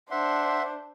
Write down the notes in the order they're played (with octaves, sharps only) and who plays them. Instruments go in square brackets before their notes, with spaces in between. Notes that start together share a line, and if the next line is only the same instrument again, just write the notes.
[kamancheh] D4 C5 [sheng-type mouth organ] E5 F#5 C6